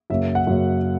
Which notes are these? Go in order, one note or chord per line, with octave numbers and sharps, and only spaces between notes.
F#2 C#3 F#3 A#3 E5
F#5
F#2 C#3 F#3 A#3